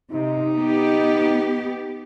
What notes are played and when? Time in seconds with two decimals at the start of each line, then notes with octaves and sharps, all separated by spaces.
0.12 C3 D#4
0.55 B3 G4